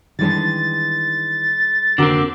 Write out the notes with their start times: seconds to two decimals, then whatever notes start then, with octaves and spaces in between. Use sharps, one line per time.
0.19 D#3 E3 G3 G#3 D4 A6
1.98 F1 D#2 D3 C4 D4 F#4 A#4 D6